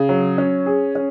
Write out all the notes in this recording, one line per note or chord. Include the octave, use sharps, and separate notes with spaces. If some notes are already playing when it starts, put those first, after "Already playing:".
Already playing: C#3
F#3
C#4
G#4
C#4